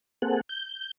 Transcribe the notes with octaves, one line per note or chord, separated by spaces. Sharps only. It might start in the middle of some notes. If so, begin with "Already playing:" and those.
A#3 C4 G#4 A4 F#5
G6